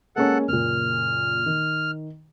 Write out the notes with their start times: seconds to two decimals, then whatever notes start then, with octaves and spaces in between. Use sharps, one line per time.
0.16 G#3 A#3 C#4 A4 F#5
0.48 F#1 A#2 F6
1.46 D#3